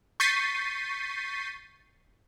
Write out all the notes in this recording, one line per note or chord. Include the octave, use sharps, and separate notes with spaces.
C#6 G6 A6 B6 C7 D#7